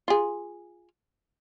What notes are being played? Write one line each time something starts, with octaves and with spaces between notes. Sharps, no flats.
F4 G#4